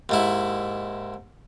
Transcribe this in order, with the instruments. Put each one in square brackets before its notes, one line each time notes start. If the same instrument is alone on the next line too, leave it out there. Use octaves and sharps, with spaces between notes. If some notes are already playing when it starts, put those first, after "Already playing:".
[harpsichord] D#2 G#2 E4